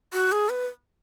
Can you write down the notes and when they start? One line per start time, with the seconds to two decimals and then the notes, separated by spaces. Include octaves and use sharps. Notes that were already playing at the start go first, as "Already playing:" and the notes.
0.14 F#4
0.32 G#4
0.49 B4